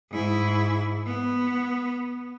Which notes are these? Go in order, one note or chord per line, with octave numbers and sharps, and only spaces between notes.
G#2 E4
B3